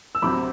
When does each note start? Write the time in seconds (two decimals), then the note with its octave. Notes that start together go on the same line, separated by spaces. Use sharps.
0.15 E6
0.22 D2 C3 F#3 C4 B5 D6